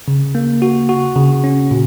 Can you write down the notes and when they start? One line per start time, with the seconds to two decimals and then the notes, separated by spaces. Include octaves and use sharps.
0.08 C#3
0.35 A#3
0.62 F#4
0.89 F#4
1.16 C#3
1.44 C#4
1.71 A#2